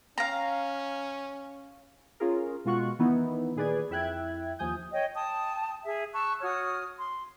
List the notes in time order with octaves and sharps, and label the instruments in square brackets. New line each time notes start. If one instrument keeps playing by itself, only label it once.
[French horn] C#4 [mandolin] F5 A#5
[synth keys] C#4 F4 G#4 A#4
B2 G#3 F4 F#4 C#6 F#6
D#3 E3 B3 D#4 E4
A#2 D#3 G#4 B4 D5 G#6
F2 E4 E5 G5 F#6 G#6
D#2 F3 G#5 D#6 G6
[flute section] C#5 D#5 G5
G5 A5 D#6
G#4 E5
A5 C#6 E6 F#6
F#4 C#5 D#6 F6
C6